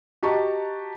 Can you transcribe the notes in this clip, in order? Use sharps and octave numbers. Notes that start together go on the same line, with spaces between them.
F#4 G4 D#5 A5 A#5 C#6